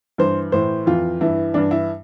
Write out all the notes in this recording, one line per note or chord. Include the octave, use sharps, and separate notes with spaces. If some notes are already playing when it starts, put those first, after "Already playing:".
G2 E3 C5
A2 E3 C5
F2 E3 F4
G2 E3 E4
G2 E3 D4
E4